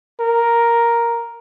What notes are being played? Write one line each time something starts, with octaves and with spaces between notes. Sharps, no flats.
A#4